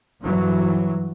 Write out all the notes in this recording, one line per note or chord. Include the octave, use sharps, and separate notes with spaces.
G2 E3 F#3